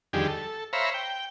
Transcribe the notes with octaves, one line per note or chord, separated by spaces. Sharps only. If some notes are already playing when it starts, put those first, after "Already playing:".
F2 D3 D#3 G3 G4 G#4
A4
C5 C#5 E5 F5 A#5 B5
G5